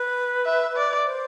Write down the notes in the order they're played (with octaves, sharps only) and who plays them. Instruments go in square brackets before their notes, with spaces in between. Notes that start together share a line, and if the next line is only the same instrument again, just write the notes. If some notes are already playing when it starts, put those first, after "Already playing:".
Already playing: [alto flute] B4
[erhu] E5
D5
[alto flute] C5